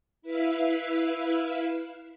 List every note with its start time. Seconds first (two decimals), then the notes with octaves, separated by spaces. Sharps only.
0.22 E4 B4 E5 F5